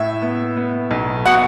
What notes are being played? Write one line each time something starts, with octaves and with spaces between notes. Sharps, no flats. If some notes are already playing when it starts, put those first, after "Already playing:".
Already playing: A2 E5
B3
B3
B1
B2 F#5